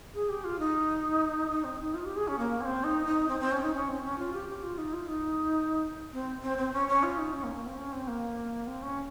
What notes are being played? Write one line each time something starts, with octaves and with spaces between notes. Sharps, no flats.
G#4
G4
F4
D#4
D#4
C4
D#4
F4
G4
G#4
C#4
A#3
C#4
C4
D#4
D#4
C4
C4
C#4
D#4
C#4
C4
C#4
F4
G4
G4
F4
D#4
F4
D#4
C4
C4
C4
C#4
C#4
F4
D#4
C#4
A#3
A#3
C4
C#4
C4
A#3
C4
C#4